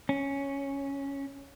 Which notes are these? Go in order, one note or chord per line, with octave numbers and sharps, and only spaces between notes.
C#4